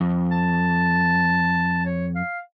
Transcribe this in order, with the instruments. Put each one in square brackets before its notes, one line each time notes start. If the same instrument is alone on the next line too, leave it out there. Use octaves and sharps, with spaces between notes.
[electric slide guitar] F2
[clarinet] A5
C#5
F5